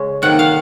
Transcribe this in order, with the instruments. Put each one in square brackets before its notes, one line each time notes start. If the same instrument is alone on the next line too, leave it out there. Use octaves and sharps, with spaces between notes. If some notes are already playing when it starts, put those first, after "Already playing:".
Already playing: [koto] C#3 G#3 C#4
C3 D#3 A#3 F#5
F5